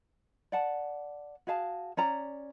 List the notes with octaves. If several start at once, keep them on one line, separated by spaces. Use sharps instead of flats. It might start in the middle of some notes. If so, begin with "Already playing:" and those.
D5 F#5 A5
F#4 G#4 F5 A5
C#4 D5 A#5